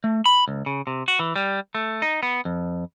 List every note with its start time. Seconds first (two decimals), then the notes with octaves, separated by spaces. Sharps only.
0.04 A3
0.26 B5
0.48 C#2
0.66 C#3
0.87 C3
1.08 F#4
1.19 E3
1.36 G3
1.75 A3
2.02 D#4
2.23 B3
2.45 F2